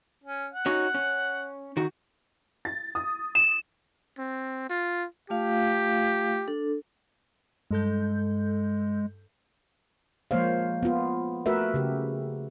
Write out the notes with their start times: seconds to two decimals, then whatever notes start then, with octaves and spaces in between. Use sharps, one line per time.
0.24 C#4
0.54 F#5
0.66 C#4 D#4 F#4
0.95 C#4
1.77 D#3 F#4
2.65 A6
2.95 D#6
3.35 E7
4.18 C4
4.69 F4
5.30 A3 F4 G4 F5
6.48 D4 A4
7.71 G2 G#3 A4 G6
10.31 F3 G#3 A#3 C5 C#5 F5
10.83 B3 F4
11.46 A3 F#4 A#4 B4 E5
11.74 C#3 G4